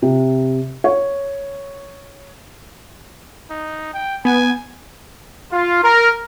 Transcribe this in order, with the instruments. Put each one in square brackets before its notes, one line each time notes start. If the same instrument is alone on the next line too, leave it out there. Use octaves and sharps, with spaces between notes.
[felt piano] C3
C#5
[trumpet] D#4
G5
[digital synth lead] B3 [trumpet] G#5
[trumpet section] F4
A#4